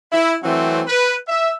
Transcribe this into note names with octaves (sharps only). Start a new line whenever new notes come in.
E4
E3 F#3 A3 C4
B4
E5